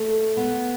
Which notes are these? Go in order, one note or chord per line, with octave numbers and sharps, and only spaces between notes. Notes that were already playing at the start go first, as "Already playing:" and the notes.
Already playing: A3
B3